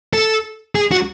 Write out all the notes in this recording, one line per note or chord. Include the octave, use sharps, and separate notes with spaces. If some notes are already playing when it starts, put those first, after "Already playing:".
A4
G#4
F#4